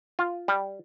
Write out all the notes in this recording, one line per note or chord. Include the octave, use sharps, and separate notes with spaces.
F4
G3